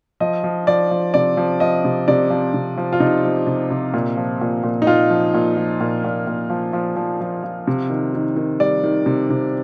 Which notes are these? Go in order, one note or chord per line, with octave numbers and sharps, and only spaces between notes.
F3 D#5
F3
F3 D5
F3
C3 D5
F3
F3 D#5
C3
C3 D5
F3
C3
F3
F4
C3 D#4
F3
C3
C3
A#2
F3
A#2
A#2
D#4
A#2 F4
F3
A#2
F3
A#2
A#2
A#2
F3
F3
F3
F3
F3
C3
D#3
D#3
D#3
G3 D5
D#3
C3
C3